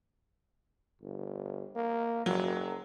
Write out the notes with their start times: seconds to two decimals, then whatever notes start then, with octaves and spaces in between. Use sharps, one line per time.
1.02 G1
1.75 A#3
2.26 F#1 F#3